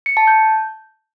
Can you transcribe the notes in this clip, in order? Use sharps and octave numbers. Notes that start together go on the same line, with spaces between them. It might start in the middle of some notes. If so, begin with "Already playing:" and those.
C#7
A5
G6